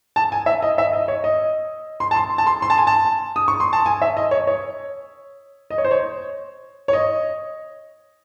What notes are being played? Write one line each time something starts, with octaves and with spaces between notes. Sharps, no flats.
A5
G#5
E5
D#5
E5
D#5
C#5
D#5
C6
A5
C6
A5
C6
C6
A5
G#5
A5
D#6
C#6
C6
A5
G#5
E5
D#5
C#5
C#5
D#5
C#5
C5
C#5
C#5
D#5